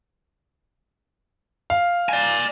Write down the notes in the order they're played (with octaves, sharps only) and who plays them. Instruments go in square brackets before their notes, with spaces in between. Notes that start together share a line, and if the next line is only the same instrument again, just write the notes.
[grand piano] F5
[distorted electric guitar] D5 G#5